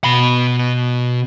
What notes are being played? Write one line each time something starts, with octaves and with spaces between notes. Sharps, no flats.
B2 B5